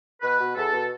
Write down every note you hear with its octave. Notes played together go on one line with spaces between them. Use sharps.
B2 B4
B2
E2 A4
B2